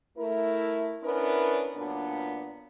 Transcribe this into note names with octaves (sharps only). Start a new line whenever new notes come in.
A3 E4 A#4
B3 C#4 D4 E4 A#4 B4
F#2 A#2 B3 D4